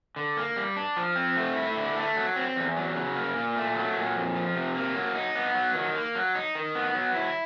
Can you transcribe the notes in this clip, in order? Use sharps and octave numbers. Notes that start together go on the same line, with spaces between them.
D3
A#3
G3
D4
F3
C4
A3
E4
D3
A3
F#3
C4
E2
F#3
C#3
A#3
A#2
A3
F#3
A#2
F2
F3
C3
A#3
F#3
D#4
B3
F#3
D#3
A#3
F#3
D#4
D#3
B3
F#3
E4